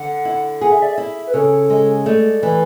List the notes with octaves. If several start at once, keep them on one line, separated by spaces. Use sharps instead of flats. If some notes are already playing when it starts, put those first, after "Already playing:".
Already playing: D3 F#5
E4
G#4 F#5
E5
D5
E4 E5
B4
C#3 A4
G#3
A3 D5
E3